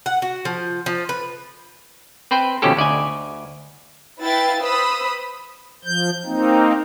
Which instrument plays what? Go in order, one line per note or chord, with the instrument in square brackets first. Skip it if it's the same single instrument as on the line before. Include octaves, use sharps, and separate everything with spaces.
[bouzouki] F#5
F#4
F3
F3
B4
[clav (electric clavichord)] C4 B4 C5 G5
D#2 B2 F3 C#4 G4 A4
D2 D5 D#5 G#5
[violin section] E4 B4 F5 G5 A6
B4 C5 B5 D#6 E6
[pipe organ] F3 G6
A#3 C4 D#4